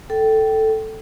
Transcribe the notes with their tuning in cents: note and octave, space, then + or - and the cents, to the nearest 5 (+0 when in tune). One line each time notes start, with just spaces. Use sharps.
A4 +0 G5 -20